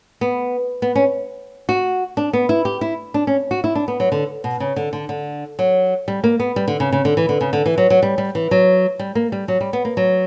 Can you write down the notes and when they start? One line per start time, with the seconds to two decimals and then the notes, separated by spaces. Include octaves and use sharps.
0.21 B3
0.82 B3
0.95 C#4
1.69 F#4
2.17 D4
2.33 B3
2.49 E4
2.65 G4
2.81 E4
3.14 D4
3.27 C#4
3.51 F#4
3.64 E4
3.75 D4
3.88 B3
4.00 F#3
4.12 D3
4.44 B2
4.60 C#3
4.76 D3
4.93 D3
5.09 D3
5.59 F#3
6.08 G3
6.24 A#3
6.40 B3
6.56 G3
6.68 D3
6.80 C#3
6.92 C#3
7.05 D3
7.17 E3
7.29 D3
7.41 C#3
7.53 D3
7.66 E3
7.78 F#3
7.90 F#3
8.02 G3
8.18 G3
8.35 E3
8.51 F#3
8.99 G3
9.15 A#3
9.32 G3
9.48 F#3
9.61 G3
9.73 B3
9.85 A#3
9.97 F#3